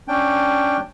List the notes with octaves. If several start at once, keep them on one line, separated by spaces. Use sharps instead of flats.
C#4 D4 G5